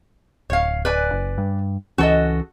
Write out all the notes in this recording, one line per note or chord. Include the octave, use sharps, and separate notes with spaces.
D1 C#5 F5
B4 D5 G#5
F#1
G2
C#2 E3 C#4 F#4 A4 D#5